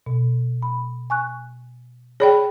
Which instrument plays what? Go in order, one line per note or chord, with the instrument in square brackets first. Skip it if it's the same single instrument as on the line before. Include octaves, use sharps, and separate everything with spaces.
[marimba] B2
B5
G#5 C#6 F#6
[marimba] G#4 B5 [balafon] C#5 D5 G5